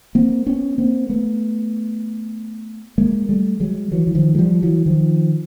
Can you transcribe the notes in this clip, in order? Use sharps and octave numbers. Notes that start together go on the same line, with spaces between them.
A#3 C4
B3 C#4
A#3 C4
A3 B3
G#3 A#3
G3 A3
F#3 G#3
E3 F#3
E3
D#3 F3
G#3
F3 G3
E3 F#3
D#3 F3